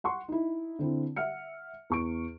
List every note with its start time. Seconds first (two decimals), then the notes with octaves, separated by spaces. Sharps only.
0.04 F#5 C6 C#6
0.28 D#4 E4
0.79 D3 C4 E4
1.16 E5 F#5 F6 C#7
1.90 E2 C#6 D7